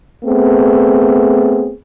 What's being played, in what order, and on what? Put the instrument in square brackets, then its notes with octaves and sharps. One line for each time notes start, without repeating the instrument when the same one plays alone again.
[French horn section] A3 B3 C4 G#4